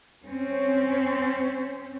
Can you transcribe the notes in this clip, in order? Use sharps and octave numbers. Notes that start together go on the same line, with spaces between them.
C4 C#4